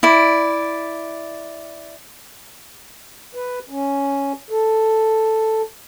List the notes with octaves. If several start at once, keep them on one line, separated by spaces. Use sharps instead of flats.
E4 D5
B4
C#4
A4